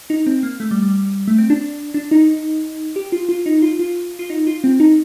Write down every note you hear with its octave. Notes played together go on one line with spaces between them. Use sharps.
D#4
C4
A#3
A3
G3
G3
A3
C4
D4
D4
D#4
G4
F4
F4
D#4
F4
F4
F4
D#4
F4
C4
D#4